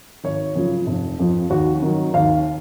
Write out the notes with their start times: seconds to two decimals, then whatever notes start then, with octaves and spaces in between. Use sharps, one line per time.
0.24 G#1 C#5
0.55 F#2 C#3 F3
0.87 F1
1.19 F2 F3
1.50 D#2 F#4
1.82 D#3 F#3
2.14 D#2 F5